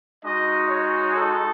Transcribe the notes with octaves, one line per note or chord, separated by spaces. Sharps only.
G#3 D#4 F#4 D#5
C#5
A4